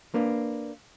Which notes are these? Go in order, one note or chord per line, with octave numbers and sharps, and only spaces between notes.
A#3 D4 B4